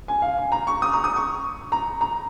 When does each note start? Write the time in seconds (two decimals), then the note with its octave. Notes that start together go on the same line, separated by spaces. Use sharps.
0.08 G#5
0.22 F5
0.38 G#5
0.52 A#5
0.67 C#6
0.82 D#6
0.93 A#5
1.04 D#6
1.16 C#6
1.72 A#5
2.01 A#5